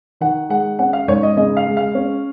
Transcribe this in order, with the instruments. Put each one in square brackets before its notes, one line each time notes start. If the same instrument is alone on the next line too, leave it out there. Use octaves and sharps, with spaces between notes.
[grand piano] D#3 F#5
G#3 F#5
C#4 F#5
F5
G#2 C#5
D#5
C#3 D#5
F5
G#3
F5
C#4